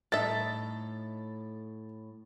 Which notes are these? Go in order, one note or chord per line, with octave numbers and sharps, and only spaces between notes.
A2 D#4 A4 E5 A6